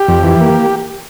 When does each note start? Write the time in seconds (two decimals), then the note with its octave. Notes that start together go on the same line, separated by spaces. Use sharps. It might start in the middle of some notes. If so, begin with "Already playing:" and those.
Already playing: G4
0.08 F2
0.23 E3
0.40 A#3